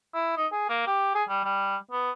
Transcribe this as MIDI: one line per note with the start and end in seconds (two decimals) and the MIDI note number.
0.14 0.33 64
0.37 0.47 63
0.52 0.69 68
0.69 0.83 58
0.87 1.14 67
1.15 1.24 68
1.29 1.41 55
1.44 1.76 55
1.91 2.11 59